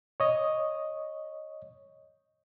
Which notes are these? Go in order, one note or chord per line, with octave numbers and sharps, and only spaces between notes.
C#5 D#5